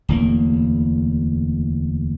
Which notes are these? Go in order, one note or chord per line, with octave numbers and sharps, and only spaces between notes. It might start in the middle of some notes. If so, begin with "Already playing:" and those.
D1 E2 A#3